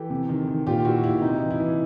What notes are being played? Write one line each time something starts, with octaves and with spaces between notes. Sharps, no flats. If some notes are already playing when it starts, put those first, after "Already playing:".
Already playing: E3 G4 A4
C3
D#3
D#3
A#2 F4 G4
A#2 E4 F#4
A#2 E4
C3 D#4
E3
E4
E3